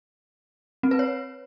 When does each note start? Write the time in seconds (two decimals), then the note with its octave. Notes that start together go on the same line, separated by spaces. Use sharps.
0.83 C4
0.91 B4
0.99 C#5